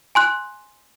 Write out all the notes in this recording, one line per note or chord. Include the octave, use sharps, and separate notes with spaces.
G#5 C6 F#6